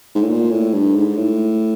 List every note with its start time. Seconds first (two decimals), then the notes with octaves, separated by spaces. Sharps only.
0.15 G#2
0.22 A2
0.29 A#2
0.51 A2
0.74 G2
0.96 G#2
1.17 A2